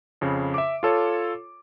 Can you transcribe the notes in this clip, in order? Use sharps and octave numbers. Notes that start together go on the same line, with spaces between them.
F2 C#3
E5 D6
F4 A4 C#5